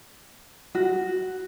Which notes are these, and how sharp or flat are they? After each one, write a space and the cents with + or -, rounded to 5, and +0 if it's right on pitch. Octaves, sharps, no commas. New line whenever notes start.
F#4 +5